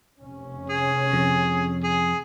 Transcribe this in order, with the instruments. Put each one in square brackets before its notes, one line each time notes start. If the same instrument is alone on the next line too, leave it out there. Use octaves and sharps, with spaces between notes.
[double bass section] F1 C3 C#4
[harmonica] G#4
[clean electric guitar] F2
[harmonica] G#4